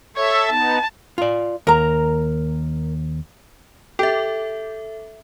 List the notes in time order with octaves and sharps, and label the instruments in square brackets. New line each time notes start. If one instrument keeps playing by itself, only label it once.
[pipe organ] A4 E5 [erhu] C#5
[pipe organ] B3 D#4 [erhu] A5
[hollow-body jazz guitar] F4 D5
[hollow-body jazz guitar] D#2 [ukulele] A#4 A#5
[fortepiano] G4 [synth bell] A4 E5